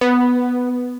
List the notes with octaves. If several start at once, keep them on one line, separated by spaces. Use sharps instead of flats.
B3